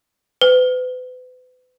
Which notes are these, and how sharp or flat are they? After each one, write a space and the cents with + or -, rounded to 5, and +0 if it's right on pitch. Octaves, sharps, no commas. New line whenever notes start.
B4 +40